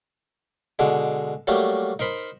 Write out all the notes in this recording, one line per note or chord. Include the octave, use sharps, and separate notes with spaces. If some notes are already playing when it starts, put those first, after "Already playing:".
B2 D3 G#3
F#3 G3 A3 A#3
D#4 A#4 C5 B5